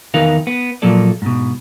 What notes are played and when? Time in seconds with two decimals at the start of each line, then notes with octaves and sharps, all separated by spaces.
0.14 E2 D#3 D#4 A#4 B4 F5
0.47 B3
0.82 A#2 F3 F#3 A#3 A4 D5
1.22 G#2 B2